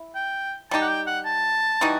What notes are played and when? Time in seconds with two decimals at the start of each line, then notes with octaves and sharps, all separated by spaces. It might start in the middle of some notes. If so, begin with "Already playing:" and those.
Already playing: E4
0.15 G5
0.71 G3 D#4 G4 A5
0.81 F#5
0.89 G5
1.07 F#5
1.26 A5
1.81 E3 G3 D#4 F#4